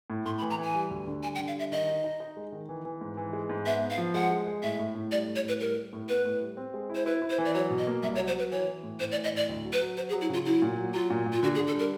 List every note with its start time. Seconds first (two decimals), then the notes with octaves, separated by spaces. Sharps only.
0.10 A2
0.26 A2 C6
0.38 B5
0.42 E3
0.50 A#5
0.58 E3 G#5
0.75 G3
0.91 D2
1.07 D3
1.23 G3 G#5
1.35 G5
1.39 D3
1.48 F5
1.56 G3 E5
1.72 D#3 D#5
1.88 D#4
2.04 D#4
2.20 D#4
2.37 G#3
2.52 D#3
2.69 E3
2.85 E3
3.01 G#2
3.17 E3
3.33 G#3
3.50 G#2
3.66 B3 E5
3.82 B3
3.90 F5
3.98 F3
4.14 G#3 F#5
4.30 G#3
4.47 G#3
4.63 A2 E5
4.79 A2
4.95 A2
5.11 G3 D5
5.27 A2
5.36 C#5
5.44 A2 B4
5.60 G3 A#4
5.76 G3
5.93 A2
6.09 B3 B4
6.25 A2
6.41 G3
6.57 C4
6.74 G#3
6.90 E4
6.95 C5
7.06 E4 B4
7.22 E4
7.30 C5
7.38 E3
7.45 D5
7.54 F#3 C#5
7.70 B2
7.78 D#5
7.87 A#3
8.03 C2 E5
8.15 C#5
8.19 F#3
8.27 C5
8.35 F#3 B4
8.51 E3 C#5
8.67 E3
8.83 A2
9.00 A2 C5
9.12 D5
9.16 E3
9.24 D#5
9.32 A2 D5
9.49 D2
9.64 F#3
9.73 B4
9.81 F#3
9.97 F#3 C5
10.09 G#4
10.13 F#3
10.21 E4
10.29 C#3 F4
10.45 F#3 E4
10.62 A#2
10.78 F#3
10.94 F#3 F4
11.10 A#2
11.26 A#2
11.33 F4
11.42 D3 F#4
11.55 G#4
11.59 D3
11.67 A4
11.75 G3 A#4